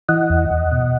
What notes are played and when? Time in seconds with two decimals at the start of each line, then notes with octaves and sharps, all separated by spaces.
0.09 E3 D#5 F#5
0.30 E2
0.51 E2
0.72 B2